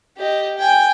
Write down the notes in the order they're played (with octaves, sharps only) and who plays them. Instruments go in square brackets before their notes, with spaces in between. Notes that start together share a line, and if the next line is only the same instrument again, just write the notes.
[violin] G4 D#5
G5 G#5